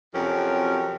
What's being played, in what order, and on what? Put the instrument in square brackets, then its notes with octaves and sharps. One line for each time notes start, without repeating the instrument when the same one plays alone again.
[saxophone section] F2 C3 F#3 C#4 G4 A#4